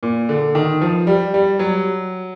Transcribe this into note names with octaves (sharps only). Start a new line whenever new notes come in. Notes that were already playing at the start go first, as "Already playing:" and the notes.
A#2
D3
D#3
F3
G3
G3
F#3